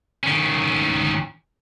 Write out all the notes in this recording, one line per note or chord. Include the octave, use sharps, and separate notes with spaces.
D#3 C#4